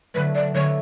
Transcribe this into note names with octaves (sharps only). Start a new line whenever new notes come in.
D3 F#3 A3 B4
D5
D3 F#3 A3 C#5